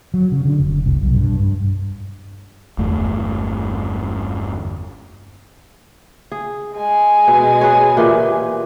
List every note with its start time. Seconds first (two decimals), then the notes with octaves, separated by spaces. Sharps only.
0.14 F#3
0.32 C#3
0.45 D3
0.59 F1
0.86 C2
1.02 B1
1.16 G2
1.40 G2
2.78 G1 E2 A3
6.32 G#4
6.76 G#3 G#5
7.28 B2
7.61 G#4 B4 C#5
7.97 A#2 E3 G4